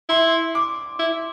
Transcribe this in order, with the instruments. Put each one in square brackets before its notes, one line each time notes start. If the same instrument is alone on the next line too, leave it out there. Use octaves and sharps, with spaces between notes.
[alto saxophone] E4 [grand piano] C6
[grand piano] D6
[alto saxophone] E4